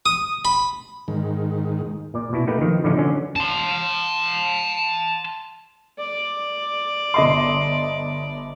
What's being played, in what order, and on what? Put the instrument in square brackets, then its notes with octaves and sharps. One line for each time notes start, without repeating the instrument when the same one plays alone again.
[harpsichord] D#6
B5
[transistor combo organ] G#2 D#3
[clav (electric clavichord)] A#2 D5
B2 E4
A3 A#3 D#4 G4 B4 G5
D#3 F3
A2 D3 E3 F3 C#4 D#4
D3 E3 F#3 C#4 D4
[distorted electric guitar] A5 C6
[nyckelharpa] D5
[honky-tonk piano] G1 D#5 C6